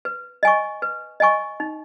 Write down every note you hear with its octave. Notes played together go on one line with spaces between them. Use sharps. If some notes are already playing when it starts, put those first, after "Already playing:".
B4
D#5 G#5 C#6
B4
D#5 G#5 C#6
D#4